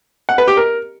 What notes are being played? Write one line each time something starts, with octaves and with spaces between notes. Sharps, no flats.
F#5
B4
G4
A#4